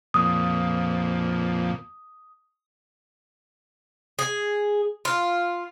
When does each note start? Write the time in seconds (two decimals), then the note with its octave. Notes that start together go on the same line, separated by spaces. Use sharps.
0.14 F2 A#2 D#6
4.19 G#4
5.05 F4